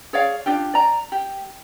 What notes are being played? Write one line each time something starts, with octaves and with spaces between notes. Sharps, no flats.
G#4 C#5 D5 F5
D4 F4 G4
D5 A#5
G4